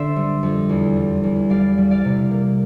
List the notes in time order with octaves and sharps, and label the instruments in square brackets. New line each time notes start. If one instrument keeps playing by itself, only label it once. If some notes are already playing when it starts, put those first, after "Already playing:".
Already playing: [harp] D3 C5 D5 E5
G3
F2
E2
G3
E2
G3 D5 F5
G3
D5 F5
C3
A#3